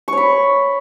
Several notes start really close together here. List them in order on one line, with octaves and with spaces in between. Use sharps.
C#6 C#5 B5